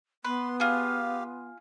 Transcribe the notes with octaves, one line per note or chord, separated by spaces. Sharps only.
B3 B4 C6
F4 G4 G#4 F5